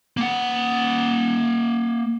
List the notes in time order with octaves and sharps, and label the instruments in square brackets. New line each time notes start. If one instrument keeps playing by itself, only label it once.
[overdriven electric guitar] A#3 F#5